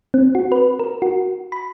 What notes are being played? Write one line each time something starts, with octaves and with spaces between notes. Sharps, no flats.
C4
F#4
B4
A#4
F#4
B5